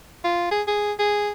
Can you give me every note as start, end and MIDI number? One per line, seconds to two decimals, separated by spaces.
0.24 0.49 65
0.51 0.62 68
0.68 0.93 68
0.99 1.31 68